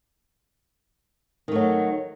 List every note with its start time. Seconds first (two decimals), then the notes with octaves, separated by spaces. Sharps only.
1.48 D#3
1.52 A3
1.55 F#3